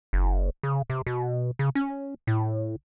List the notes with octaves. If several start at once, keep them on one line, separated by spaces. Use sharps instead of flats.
F#1
C#3
C3
B2
C#3
C#4
A2